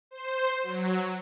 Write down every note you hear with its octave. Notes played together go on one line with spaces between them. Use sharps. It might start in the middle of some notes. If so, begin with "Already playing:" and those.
C5
F#3